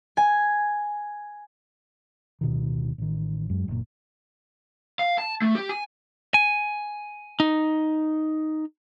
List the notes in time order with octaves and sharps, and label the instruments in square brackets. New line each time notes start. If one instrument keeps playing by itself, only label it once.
[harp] G#5
[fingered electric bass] D1 B2 D#3
A1 D#3
F#2 F#3 G#3
F#1 A#2
[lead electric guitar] F5
A5
A3
G4
G#5
[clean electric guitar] G#5
D#4